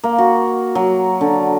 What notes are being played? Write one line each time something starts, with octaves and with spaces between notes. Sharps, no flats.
A#3
F#4
F#3
D3